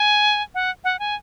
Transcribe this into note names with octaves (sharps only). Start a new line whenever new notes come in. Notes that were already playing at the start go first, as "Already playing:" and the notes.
Already playing: G#5
F#5
F#5
G#5